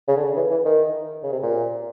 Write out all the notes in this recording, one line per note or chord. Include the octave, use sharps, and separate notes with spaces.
C#3
D3
E3
E3
D#3
C#3
C3
A#2